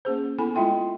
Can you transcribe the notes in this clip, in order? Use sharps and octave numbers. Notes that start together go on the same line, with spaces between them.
A#3 C#4 G#4 C5
B3 E4 A4 G#5 B5
G#3 E4 F4 E5 G5 C6